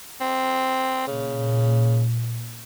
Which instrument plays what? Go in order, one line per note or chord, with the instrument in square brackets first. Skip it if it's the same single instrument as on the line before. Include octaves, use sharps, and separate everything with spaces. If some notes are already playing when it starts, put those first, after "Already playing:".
[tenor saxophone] C4
[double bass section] A#2 [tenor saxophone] C#3